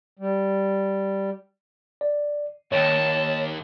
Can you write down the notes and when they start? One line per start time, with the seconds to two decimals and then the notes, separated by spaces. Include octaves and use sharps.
0.19 G3
2.01 D5
2.72 D#2 D#3 C#5 G5 A5